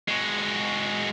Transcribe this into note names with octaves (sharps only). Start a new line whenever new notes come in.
G#3 F#4